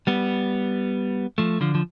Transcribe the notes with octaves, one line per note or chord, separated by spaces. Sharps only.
G3 B3
F3 A3
D3 F3
F3